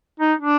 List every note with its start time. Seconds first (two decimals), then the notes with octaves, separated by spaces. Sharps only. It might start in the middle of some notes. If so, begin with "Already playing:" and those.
0.20 D#4
0.39 D4